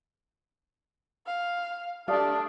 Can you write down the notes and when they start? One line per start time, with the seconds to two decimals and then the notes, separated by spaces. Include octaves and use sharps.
1.26 F5
2.08 A3 D4 G4 D5 F5 A5 D#6 F6